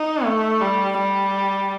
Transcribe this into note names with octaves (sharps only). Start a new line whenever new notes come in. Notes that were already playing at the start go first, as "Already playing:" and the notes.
Already playing: D#4
A3
G3
G3